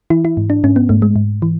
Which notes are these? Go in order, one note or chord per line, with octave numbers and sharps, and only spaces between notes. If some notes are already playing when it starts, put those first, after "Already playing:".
E3 E4
E4
G#2
D4
G#2 C#4
B3
G#2 A3
G#3
G#2
E3